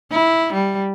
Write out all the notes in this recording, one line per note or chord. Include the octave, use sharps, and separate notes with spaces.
E4
G3